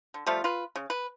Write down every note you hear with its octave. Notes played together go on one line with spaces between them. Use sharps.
D3
F3 G3 A3 F4
F4 B4
C#3
B4